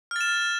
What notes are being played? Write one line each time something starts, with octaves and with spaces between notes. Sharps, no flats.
F6 A6 E7